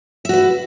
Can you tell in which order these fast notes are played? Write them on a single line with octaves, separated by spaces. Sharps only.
E5 F#4 B4